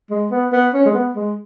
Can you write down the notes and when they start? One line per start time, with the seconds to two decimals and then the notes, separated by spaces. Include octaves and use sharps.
0.10 G#3
0.31 B3
0.52 B3
0.74 C#4
0.85 G#3
0.94 B3
1.16 G#3